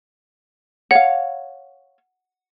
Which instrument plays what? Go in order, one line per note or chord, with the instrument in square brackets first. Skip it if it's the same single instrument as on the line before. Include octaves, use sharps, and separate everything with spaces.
[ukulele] C#5 F5 [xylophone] F#5